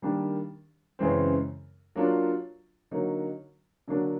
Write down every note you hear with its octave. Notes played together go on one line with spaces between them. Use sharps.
D#3 G3 A#3 D4 G4
F#2 C#3 E3 G#3 C4
F#3 A#3 D4 F4
D3 F#3 A#3 D#4
D3 F#3 A#3 D4